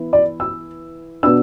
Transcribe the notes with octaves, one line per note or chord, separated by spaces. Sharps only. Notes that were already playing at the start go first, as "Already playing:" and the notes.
Already playing: E3 B3 E4
D5
E6
B2 B3 D4 E6